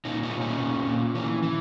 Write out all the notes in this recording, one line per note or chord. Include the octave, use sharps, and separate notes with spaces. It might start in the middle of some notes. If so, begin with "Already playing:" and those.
A#2 C#4 D#4
C#4 D#4
A#2
C#4
A#2
A#2
E3 C#4
E3